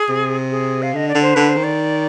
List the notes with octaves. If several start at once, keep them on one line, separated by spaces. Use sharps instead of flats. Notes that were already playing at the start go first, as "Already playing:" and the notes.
Already playing: G#4
C3
G#4
F5
D3 D#5
D5
D3
C5
D3 B4
C5
D#3
D5